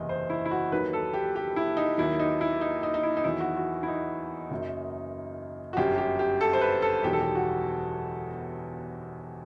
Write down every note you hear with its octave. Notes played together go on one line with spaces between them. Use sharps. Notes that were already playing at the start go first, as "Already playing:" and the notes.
Already playing: F#1 E2 C3 E3 D#5
C5
E4
E4
F#4
D#2 D#3 F#3 B4
A4
G4
G4
E4
D#4
D#2 D#3 F#3 E4
D#4
E4
D#4
D#4
D#4
E4
D#4
E2 D#3 F#3 E4
F#4
F#4
E4
D#4
F#1 F#2 F#3
F#4
G1 F#2 F#3 G4
G4
G4
A4
C5
B4
A4
E1 E2 D#3 F#3 G4
A4
G4
F#4